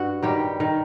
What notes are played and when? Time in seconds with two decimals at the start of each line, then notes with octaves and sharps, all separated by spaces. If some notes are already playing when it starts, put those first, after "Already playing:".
Already playing: G2 F#4
0.23 D#3 G3 G4
0.60 D#3